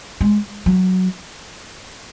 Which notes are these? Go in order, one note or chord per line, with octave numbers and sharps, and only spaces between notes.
G#3
F#3